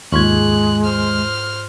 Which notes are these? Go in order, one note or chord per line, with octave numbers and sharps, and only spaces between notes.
D#2 G#2 G#3 F4 C#6 F#6 G#6
C5 F6